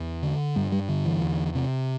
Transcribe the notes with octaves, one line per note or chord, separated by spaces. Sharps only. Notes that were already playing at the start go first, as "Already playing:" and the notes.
Already playing: E2
D3
G2 G3
G3
D3
E3
E2
C3